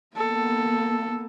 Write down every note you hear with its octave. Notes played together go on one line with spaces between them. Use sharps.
A#3 B3 A4